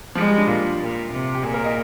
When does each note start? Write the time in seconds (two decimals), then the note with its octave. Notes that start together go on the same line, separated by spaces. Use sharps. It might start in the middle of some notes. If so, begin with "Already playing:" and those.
0.15 F3 G#3
0.26 G3
0.38 D4
0.47 A#2 F4
0.80 A#2
1.12 C3
1.34 G4
1.43 A#2 G#4
1.54 A#4
1.64 D#5